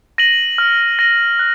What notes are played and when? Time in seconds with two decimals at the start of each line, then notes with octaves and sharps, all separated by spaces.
0.18 A#6 D#7 F#7
0.58 F6
0.99 A#6 D#7 F#7
1.39 F#6